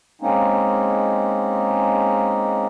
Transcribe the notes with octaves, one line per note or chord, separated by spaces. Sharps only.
G#3 A#3 C4 C#4 D#4